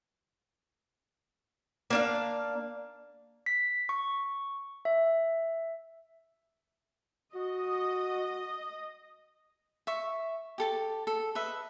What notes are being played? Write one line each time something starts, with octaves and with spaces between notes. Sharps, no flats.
A#3 D4 F5
B6
C#6
E5
F#4 D#5
E5 C#6
G4 A4 A5
A4
B4 D#5 E5